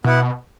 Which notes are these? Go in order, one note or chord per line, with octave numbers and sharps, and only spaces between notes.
B2 B3 E4 B4 F#5